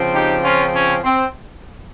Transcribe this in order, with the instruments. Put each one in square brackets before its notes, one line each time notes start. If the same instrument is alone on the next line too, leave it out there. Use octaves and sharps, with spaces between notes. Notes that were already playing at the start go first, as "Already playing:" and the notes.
Already playing: [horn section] C#3 F3 C4
D#4 G4
C#4 F4
C#4
C4